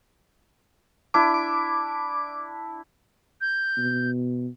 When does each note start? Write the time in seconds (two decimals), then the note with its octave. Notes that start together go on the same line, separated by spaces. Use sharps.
1.14 D4 E4 B5 D6
1.34 D6
3.41 G6
3.78 B2